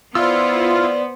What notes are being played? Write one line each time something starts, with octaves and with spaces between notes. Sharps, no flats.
B3 E4 F4 C5 D5 E6